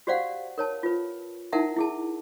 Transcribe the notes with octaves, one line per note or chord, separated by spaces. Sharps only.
F#4 G4 C5 D5 F5 F#5
A#4 C#5 A5
F4 B4
D#4 E4 A#4 E5 F#5 A5
E4 G#4 A5